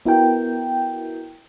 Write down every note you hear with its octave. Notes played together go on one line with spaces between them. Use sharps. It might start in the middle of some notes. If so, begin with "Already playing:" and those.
B3 E4 F#4 A#4 G5